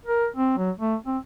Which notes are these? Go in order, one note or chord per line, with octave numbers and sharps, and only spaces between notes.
A#4
C4
F#3
A3
C4